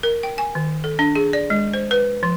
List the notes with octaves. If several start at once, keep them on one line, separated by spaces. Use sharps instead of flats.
A#4
G5
G#5
D#3
A4
D4
G#4
D5
G#3
C5
B4
F3